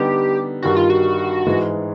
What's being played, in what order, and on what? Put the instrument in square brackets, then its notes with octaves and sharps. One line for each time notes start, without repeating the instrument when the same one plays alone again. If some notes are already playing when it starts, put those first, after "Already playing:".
Already playing: [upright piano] D3 G3 B3 D#4 [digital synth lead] G4
[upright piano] G2 D#3 G3 [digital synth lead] F#4
[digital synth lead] F4
F#4
[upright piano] G#2 E3 G#3